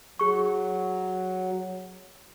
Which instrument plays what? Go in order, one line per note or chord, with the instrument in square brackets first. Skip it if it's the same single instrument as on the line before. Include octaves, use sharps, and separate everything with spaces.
[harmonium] F#3 [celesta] G#4 C#6